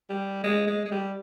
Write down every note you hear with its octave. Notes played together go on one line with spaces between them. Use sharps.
G3
G#3
G#3
G#3
G3